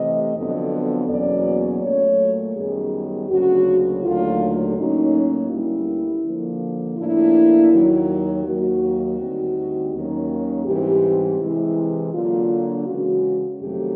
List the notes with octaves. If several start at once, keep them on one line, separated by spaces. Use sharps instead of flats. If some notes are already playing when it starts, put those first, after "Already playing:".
Already playing: C3 E3 A3 D#5
F2 D3 F#3 B3
E2 B2 F#3 A#3 C#4 D5
A#2 F#3 A3 C#5
F#2 D#3 G3 B3 D#4 G#4
D2 C#3 F#3 A#3 F#4
D#2 D3 F#3 A3 F4
A2 F#3 A#3 C#4 D#4
D2 D3 G3 A#3 C#4 E4
D3 F3 A#3
A2 F3 A#3 D4 E4
D#2 D#3 F#3
D#2 D#3 F#3 A#3 F#4
D2 D3 G3 C4 D#4
D#2 D#3 F#3 A#3 C#4
G#2 E3 G3 C4 G4
C3 E3 G#3 E4
D3 F#3 A#3 D4 F4
C#3 E3 G#3 F#4
F2 C3 D#3 F#3 A3 G4